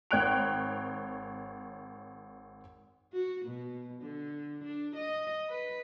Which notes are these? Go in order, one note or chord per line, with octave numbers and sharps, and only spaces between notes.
G#1 C#5 G5 F#6 D7 F7
F#4
B2
D3
D4
D#5
B4